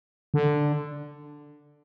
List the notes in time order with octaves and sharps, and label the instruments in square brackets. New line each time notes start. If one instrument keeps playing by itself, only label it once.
[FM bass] D3